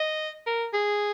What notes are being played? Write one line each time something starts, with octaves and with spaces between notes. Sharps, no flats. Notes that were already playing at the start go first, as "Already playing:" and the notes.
Already playing: D#5
A#4
G#4